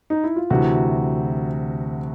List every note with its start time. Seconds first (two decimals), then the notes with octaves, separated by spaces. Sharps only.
0.10 D#4
0.24 E4
0.36 F4
0.50 D2 C3 E3 F#4